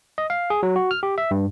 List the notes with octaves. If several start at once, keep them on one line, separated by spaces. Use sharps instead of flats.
D#5
F5
G#4
F#3
F#4
F6
G4
E5
G2